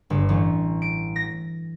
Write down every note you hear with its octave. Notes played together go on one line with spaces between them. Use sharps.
G1
A1
D7
A#6